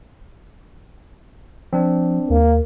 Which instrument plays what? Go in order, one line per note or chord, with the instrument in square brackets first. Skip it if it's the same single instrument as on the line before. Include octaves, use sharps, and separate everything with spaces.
[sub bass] F3 [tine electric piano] C4 D4
[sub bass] D#2 [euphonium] A#3